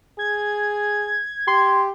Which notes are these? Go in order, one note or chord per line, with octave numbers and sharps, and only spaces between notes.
G#4 G#6
G4 C6